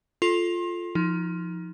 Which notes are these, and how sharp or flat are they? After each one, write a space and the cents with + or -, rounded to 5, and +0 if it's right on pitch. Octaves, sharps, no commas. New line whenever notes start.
F4 +0 A4 -10 C6 +35
F3 +0 D#4 +30